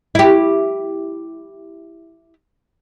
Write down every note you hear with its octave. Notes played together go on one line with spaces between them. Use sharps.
E4 G4